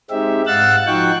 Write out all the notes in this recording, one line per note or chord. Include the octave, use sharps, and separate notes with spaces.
G#3 C4 D#4 G4 E5
G#2 F5 F#5 E6 F#6 A6
F3 D#4 F#4 G5 C#6 F#6